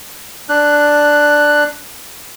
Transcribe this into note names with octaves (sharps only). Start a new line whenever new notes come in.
D4 F#6